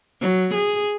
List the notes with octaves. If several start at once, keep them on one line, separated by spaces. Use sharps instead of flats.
F#3
G#4